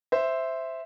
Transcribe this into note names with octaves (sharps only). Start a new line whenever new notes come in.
C5 E5